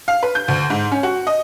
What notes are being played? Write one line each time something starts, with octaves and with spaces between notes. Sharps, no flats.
F5
B4
G6
D2
G#2
C#4
F#4
D#5